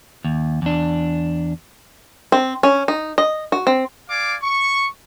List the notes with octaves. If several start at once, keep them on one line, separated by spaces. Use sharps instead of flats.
D#2
E2 D4
C4
C#4
D#4
D#5
F#4
C4
D5 F5 G#5 D6
C#6